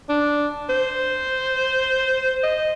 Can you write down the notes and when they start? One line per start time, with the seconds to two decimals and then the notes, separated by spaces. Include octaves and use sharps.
0.09 D4
0.70 C5
2.44 D#5